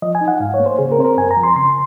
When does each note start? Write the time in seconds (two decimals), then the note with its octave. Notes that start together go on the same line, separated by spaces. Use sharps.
0.02 F3 D#5
0.15 G#5
0.21 D#4
0.28 F#5
0.40 G#2 F5
0.54 C#5
0.60 A#3
0.66 C5
0.79 C#3 G#4
0.92 A#4
0.98 C4 C5
1.05 A#4
1.18 F#2 G#5
1.31 A#5
1.37 F3
1.43 C6
1.56 C#3 C6